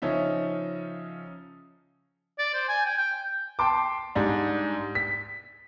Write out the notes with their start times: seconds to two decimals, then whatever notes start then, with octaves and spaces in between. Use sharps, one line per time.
0.02 C#3 F3 C#4 D#4 E5
2.38 D5
2.54 C5
2.69 G#5
2.85 G5
2.98 G5
3.59 G5 A5 C6 D6
4.15 G#2 G3 D4
4.95 B6